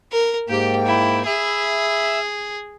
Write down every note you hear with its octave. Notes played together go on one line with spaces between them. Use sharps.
A#4
G#2 A#3 G4 G5
E4
G#4 E5 B5 E6